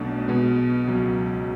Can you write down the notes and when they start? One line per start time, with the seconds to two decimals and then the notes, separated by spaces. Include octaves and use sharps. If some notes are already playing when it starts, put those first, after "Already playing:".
Already playing: B1 B2 F#3 A3 D4
0.28 B2 G#3 B3
0.87 C#2 B2 F#3